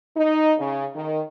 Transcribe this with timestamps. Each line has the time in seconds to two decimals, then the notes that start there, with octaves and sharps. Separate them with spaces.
0.16 D#4
0.59 C#3
0.95 D#3